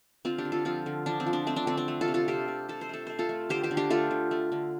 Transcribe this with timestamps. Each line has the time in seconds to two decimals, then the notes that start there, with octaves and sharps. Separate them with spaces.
0.25 D3 C4 F4
0.38 D4 G4
0.45 D3
0.52 F4 A4
0.65 F3 C4 F4
0.86 D3
1.06 F3 D4
1.20 C4
1.26 F3
1.33 D4
1.47 A3 C4
1.56 D4
1.67 D3 C4
1.77 D4
1.88 A3
2.01 F4 A4
2.08 C3
2.14 F4 A4
2.28 C3 G4 C5
2.48 C3
2.69 C3 A4
2.81 C5
2.89 A3 A4
3.07 A3 C5
3.19 F4 A4
3.29 A3
3.49 D3 G4 C5
3.63 G4 C5
3.71 D3
3.77 D4 G4
3.90 A3 F4 A4
4.11 D3
4.31 A3
4.52 D3